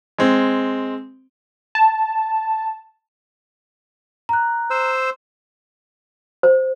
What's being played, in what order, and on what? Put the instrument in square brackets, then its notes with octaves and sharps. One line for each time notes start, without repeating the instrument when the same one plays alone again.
[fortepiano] G#3 C4
[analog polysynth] A5
[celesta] A#5 F#6
[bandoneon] C5 E6
[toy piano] C5